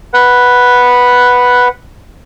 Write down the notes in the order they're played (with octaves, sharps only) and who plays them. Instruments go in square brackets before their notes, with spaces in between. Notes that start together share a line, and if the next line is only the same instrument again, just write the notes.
[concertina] B4 F#5